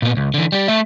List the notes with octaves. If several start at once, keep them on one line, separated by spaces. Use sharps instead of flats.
A#2 B3
C#2
D3 E3
G3 G4
A3 E5